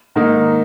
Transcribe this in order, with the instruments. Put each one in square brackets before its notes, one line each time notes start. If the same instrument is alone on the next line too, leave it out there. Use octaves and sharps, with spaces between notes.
[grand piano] G#2 D#3 A#3 D#4